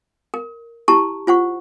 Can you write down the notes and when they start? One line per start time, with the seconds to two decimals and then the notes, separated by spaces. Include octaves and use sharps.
0.34 A#4
0.88 E4 G4 A5 A#5 C#6
1.27 F4 C5 F#5 C#6